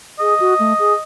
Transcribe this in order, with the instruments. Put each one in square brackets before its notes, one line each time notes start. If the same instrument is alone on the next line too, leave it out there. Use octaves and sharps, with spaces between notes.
[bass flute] G#4 [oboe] D#5
[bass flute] F#4
A3
G#4